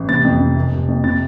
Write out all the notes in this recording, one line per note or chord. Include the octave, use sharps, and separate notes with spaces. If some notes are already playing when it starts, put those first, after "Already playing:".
Already playing: A1
C3 A6
F2
C3
F1
F1
F2
C3 A6